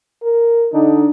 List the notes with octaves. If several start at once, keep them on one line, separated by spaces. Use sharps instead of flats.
A#4
D3 D4 D#4